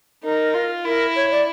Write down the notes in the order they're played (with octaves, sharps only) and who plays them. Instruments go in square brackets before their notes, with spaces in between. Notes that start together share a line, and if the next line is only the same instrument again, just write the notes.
[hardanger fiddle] D#4 [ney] A#4
[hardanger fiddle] F4
[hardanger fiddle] E4 [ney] A#4
[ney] C#5
D5